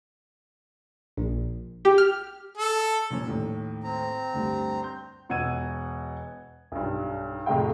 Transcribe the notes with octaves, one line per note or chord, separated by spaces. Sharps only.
A#1
G4
F6
A4
A#2 F3 C#4
D#2 A2
C4 A#5
D2 G2
C6 G6
E1 B2 F#5 E6 G#6 D#7
B1 G2
F2 A2 C3 G#3 F5 G5